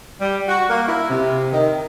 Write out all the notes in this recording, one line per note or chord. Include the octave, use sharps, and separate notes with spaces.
G3
F#4
A#3
E4
C3
D#3